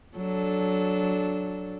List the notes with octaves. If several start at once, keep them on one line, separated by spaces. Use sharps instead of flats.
F#3 D4 A4